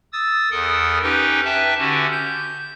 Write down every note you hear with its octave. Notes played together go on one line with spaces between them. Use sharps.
D#6 E6 A6
E2 A4 A#4 D#6
C#4 D#4 G4 B4 G5
B4 E5 G5 A5
D3 C#4 F#4 G4
G6